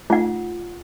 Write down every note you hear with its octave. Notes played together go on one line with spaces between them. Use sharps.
A3 D#4 F4 F#5